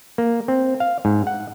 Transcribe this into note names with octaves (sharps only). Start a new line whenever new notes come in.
A#3
C4
F5
G#2
F#5